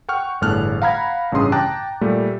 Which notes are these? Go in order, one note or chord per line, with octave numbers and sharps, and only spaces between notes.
F#5 G5 C#6 F6
G1 E2 A2 A5 F6 F#6
F5 F#5 A#5 B5 F6 G#6
A1 G2 C#3 C6 D#6
G5 A5 A#5 D6 F#6
A#2 G3 A3